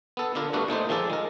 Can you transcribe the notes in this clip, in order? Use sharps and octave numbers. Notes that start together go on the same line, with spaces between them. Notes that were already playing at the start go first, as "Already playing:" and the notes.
B3 A4
D3 D4 F4 A#4
G2 A3 B3 D4 F#4
A#2 A3 D#4 C5
D#3 F3 G#3 A4 D5
G#3 A#4